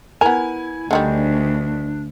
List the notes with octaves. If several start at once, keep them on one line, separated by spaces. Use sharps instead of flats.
B3 E4 A#4 G#5
D2 D3 D#3 G3 D4